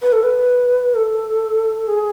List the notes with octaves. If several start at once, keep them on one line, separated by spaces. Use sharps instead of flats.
B4
A4
B4
A4
G#4